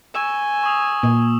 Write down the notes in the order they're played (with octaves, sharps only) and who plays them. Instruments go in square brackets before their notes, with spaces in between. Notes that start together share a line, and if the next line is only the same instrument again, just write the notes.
[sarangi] G#5 [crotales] C#6 E6 E7
[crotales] C#6 D#6 F7
[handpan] A#2